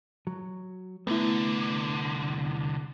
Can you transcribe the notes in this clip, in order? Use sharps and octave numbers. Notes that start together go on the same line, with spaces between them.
F#3
C2 D3 A3 B3 E4